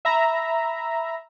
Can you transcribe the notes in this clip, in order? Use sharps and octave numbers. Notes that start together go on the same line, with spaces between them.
E5 A#5 B5